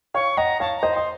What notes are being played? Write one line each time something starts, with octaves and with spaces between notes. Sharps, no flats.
C#5 F5 C#6
D#5 F#5 A#5
C#5 F5 A5
A#5
C5 D#5
D#5 C6